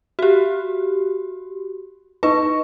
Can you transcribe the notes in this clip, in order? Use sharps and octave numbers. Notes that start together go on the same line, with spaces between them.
F#4 G4
D#4 B4 C#6